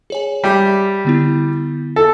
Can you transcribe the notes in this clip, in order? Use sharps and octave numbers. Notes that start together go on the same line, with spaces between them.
G#4 C#5 G#5
G3 E5 D6 B6
D3 B3 E4
A4